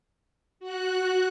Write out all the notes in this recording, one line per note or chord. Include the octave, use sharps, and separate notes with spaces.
F#4 F#6